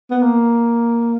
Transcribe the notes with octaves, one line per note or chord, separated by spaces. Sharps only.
B3
A#3